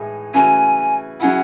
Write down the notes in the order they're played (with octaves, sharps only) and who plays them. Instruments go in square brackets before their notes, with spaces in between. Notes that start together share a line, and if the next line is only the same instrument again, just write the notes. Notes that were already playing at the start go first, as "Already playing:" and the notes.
Already playing: [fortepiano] A2 E3 G#3 D#4 G#4
[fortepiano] C#3 E3 A3 C#4 F#4 [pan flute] G#5
[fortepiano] C#3 F#3 C#4 E4 [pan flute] F#5